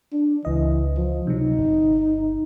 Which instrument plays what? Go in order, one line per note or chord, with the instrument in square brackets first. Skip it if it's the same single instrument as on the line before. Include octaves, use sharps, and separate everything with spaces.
[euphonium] D4
[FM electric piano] C#2 D#5 [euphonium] E3
[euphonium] F3
[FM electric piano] C3 F#3 [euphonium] D#4
[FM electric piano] G1